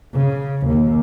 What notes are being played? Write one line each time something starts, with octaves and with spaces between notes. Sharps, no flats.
C#3
D#2